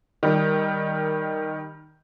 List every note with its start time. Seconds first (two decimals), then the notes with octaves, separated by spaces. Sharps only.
0.23 D#3 G3